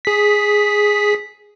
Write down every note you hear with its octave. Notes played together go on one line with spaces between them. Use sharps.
G#4 B6